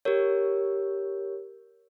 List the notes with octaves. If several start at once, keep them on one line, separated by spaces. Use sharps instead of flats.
G4 A#4 C#5